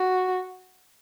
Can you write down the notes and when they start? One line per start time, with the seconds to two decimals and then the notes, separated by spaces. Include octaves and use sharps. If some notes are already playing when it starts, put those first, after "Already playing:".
Already playing: F#4